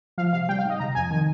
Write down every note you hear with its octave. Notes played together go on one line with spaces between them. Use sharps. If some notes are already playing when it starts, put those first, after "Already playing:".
F3 F5
C3 F5
G3 G5
F5
G#2 D#5
C3 A#5
F2 G#5
D#3 G#5